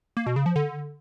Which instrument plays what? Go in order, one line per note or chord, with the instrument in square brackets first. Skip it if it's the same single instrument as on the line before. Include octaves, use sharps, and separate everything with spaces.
[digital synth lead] A#3
B2
C#3
F3
D3